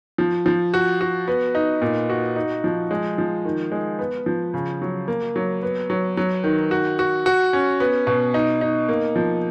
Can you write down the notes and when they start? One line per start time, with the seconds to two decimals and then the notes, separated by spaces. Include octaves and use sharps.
0.18 F3
0.46 F3
0.74 F#4
1.01 F#4
1.28 B3
1.55 D#4
1.82 A#2
2.10 F#4
2.36 D#4
2.64 F3
2.91 G#3
3.18 F3
3.45 D#3
3.72 G#3
3.99 B3
4.26 F3
4.54 C#3
4.82 F#3
5.08 A#3
5.36 F#3
5.62 B3
5.90 F#3
6.17 F#3
6.44 D#3
6.71 F#4
6.99 F#4
7.26 F#4
7.53 C#4
7.80 B3
8.07 B2
8.34 D#4
8.61 D#4
8.89 A#3
9.16 F3